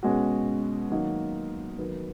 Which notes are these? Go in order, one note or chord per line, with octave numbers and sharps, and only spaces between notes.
B2 G#3 C#4 F#4
D#3 F#3 A#3 D#4 F#4
D#3 F#3 B3